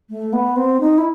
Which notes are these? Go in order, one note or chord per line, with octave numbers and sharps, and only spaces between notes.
A3
B3
C4
D#4
E4